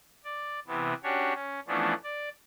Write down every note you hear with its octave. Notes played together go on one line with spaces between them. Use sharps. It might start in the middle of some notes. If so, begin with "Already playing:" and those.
D5
C3 E3 B3
C#4 D4 F#4 G4 C#5
C#4
E3 F3 A3 B3 C#4 D4
D5